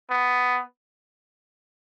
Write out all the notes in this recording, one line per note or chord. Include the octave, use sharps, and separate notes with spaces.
B3